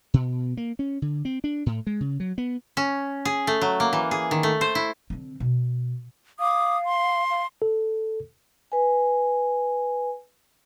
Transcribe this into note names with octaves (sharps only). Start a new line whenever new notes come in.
B2
A#3
C#4
D3
C4
D4
A2
G#3
C#3
F#3
B3
C#4
G#4
A3
F#3
A#3
E3
G#4
D#3
A3
C5
E4
D3 C4
B2
F5 D6 D#6
C6
F5
A4
B4 G#5